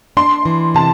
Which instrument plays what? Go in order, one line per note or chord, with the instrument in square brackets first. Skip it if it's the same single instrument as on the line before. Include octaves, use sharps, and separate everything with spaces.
[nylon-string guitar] D4 [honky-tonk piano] C6
[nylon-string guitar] E3
[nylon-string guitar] C3 [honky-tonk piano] A5